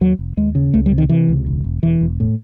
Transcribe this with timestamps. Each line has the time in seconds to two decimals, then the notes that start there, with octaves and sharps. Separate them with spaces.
0.01 D#2 F#3
0.19 F1
0.37 D#2 G#3
0.55 C#3
0.74 C#2 A3
0.86 G3
0.92 C3
0.98 D#3
1.09 C3 E3
1.29 C#2
1.46 E1
1.64 E1
1.83 E1 E3
2.01 E1
2.20 A2